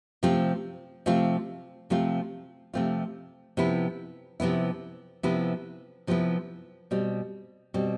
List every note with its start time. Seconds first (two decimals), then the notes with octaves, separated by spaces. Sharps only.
0.23 C3 F3 A3 C4 F4
1.06 C3 F3 A3 C4 F4
1.90 C3 F3 A3 C4 F4
2.74 C3 F3 A3 C4 F4
3.57 C3 F3 B3 E4
4.40 C3 F3 B3 E4
5.23 C3 F3 B3 E4
6.07 C3 F3 B3 E4
6.91 B2 G3 C4
7.74 B2 G3 C4